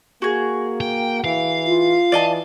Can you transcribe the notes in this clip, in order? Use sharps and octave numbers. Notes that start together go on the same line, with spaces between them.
A#3 F#4 G#4
G5
E3 F5
F4
E3 D5 D#5 A5